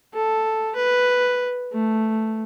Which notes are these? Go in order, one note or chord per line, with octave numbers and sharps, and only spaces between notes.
A4
B4
A3